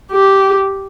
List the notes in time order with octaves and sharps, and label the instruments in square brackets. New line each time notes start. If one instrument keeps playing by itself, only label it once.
[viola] G4